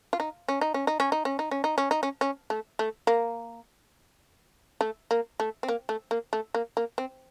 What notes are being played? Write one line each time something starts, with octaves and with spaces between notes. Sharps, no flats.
F4
D#4
C#4
D#4
C#4
D#4
C#4
D#4
C#4
D#4
C#4
D#4
C#4
D#4
C#4
C#4
A3
A3
A#3
A3
A#3
A3
C4
A#3
A3
A#3
A3
A#3
A#3
C4